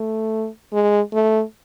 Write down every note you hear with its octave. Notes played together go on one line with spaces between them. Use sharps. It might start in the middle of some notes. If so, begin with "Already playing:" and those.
Already playing: A3
G#3
A3